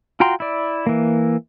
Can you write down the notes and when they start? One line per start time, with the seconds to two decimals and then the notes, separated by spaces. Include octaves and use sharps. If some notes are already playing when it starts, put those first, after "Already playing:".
0.20 F4 F#4 G5 A#5 C6
0.40 E4 D5
0.87 E3 A#3